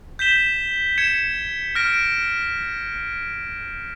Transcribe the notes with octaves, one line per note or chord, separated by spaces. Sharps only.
G6 B6 E7 G7
G#6 C#7 E7
F6 A#6 D7